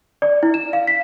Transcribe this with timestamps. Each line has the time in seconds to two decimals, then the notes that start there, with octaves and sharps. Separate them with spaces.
0.22 D5
0.43 E4
0.54 E7
0.73 F5
0.87 B6